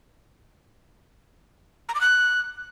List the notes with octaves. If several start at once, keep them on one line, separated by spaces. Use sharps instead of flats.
A#5
D6
F#6